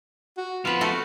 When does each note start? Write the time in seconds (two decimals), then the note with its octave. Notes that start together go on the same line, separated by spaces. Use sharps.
0.37 F#4
0.65 F3 B3 C4 F4 B4
0.81 A3 F#4